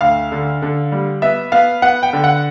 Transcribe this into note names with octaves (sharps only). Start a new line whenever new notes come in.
D2 F5
D3
D3
G3
B3 E5
B3 F5
B3 F#5
G5
D3
F#5